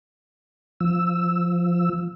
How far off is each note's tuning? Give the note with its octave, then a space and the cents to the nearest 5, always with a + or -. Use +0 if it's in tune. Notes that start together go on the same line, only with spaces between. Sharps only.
F3 +0 E6 +0